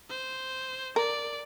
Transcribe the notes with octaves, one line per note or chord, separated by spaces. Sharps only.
C5
A#4 D5